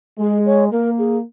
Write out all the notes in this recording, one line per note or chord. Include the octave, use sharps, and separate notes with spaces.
G#3 G#4
C#5
A#3 A#4
G#4